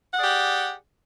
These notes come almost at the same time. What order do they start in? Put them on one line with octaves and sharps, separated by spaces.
F#5 G#4 D5 G4